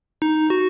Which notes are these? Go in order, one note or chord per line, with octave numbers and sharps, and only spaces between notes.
D#4
F#4